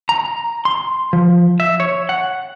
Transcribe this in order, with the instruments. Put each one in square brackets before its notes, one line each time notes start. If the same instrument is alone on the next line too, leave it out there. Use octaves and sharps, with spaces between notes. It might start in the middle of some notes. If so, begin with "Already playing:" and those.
[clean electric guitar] A#5
C6
F3
E5
C#5
F#5